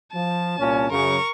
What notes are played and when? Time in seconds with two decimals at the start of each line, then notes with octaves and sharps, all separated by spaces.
0.13 F3 A5
0.58 C2 A#2 C#4
0.90 F#2 C#3 A#4 C#6